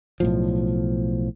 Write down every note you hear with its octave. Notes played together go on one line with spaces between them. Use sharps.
B1 A2 F3